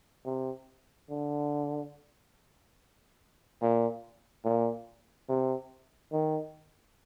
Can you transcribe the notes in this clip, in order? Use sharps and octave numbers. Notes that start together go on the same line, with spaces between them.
C3
D3
A#2
A#2
C3
D#3